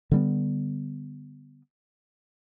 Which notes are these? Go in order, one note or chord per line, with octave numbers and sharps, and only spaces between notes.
D3 G3 B3